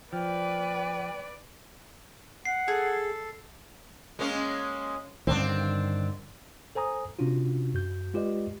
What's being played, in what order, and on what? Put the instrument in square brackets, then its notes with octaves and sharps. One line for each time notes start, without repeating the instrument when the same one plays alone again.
[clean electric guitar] F3 [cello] B4 D5 [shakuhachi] G5
[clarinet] F#5 [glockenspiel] C7
[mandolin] G#4 [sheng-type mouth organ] A4
[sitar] G#3 A#3 C#4
[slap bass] G2 D3 D#3 [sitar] C4 D4
[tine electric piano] A4 C5 G#5 A#5 D#6
C3 C#4 D4 F4 F#4
F#2 F#4 G6
G#3 F4 G4 B4 D5 D#5